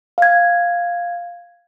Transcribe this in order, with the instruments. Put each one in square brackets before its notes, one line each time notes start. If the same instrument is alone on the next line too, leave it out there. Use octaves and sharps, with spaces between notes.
[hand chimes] F5 G#6